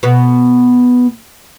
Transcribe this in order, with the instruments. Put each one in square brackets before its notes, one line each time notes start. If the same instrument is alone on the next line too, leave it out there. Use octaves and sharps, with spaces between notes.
[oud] B2 B3